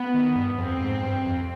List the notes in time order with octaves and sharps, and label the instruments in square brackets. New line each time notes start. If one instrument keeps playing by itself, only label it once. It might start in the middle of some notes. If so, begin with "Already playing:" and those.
Already playing: [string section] B3
[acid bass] D#3
G2
[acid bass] F2 [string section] C4
[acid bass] G#2
G2
F2